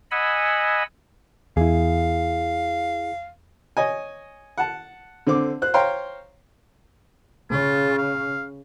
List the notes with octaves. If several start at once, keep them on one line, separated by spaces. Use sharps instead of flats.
D#5 F#5 G#5 B5 E6
E2 E4 G#4 F5
C#5 D#5 G#5
F#5 A5
D3 C4 D6
C5 F#6
C5 C#5 F5 G5 A#5 C6
C#3 F4
F5